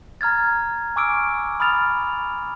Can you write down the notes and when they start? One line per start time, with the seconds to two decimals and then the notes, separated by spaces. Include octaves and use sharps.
0.21 A#5 F6 G#6 A6
0.96 G#5 C#6 D6 E6 F6 D7
1.60 B5 D#6 F6 A6 F7